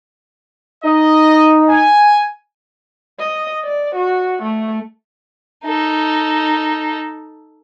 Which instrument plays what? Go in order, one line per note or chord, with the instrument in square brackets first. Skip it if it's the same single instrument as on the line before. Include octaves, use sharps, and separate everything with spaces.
[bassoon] D#4 [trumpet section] D#5
[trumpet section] G#5
[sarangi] D#5
D5
F#4
A3
[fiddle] D#4 A4